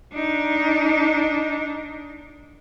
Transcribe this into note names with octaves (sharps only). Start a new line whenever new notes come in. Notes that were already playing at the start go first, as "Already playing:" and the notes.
D4 D#4